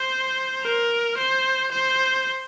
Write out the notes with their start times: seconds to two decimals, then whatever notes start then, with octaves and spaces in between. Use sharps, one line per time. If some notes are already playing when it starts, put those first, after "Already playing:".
Already playing: C5
0.62 A#4
1.18 C5
1.72 C5